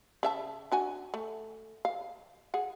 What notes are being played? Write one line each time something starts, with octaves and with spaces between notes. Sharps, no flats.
C#3 E5 A5
D4 F#4 G#5
A3
F5
G#4 F#5